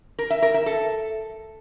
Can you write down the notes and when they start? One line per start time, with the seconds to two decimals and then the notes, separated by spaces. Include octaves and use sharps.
0.19 A#4
0.30 E5
0.42 A#4
0.54 E5
0.66 A4